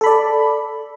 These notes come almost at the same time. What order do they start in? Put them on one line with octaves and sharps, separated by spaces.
A4 B5 D5